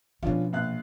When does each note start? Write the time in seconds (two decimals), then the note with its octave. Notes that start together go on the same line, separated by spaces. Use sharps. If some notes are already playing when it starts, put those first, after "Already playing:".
0.23 B2 F3 C#4 D4 F4
0.53 A#1 F5 F#6